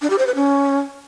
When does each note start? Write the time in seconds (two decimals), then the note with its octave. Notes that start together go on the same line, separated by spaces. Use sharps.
0.02 D4
0.10 G4
0.18 C5
0.27 B4
0.35 C#4